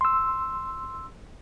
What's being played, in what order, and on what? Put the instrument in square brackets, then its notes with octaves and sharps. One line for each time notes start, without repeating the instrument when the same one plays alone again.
[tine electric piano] C6 E6